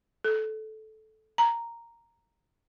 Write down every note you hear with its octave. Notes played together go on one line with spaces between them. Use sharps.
A4
A#5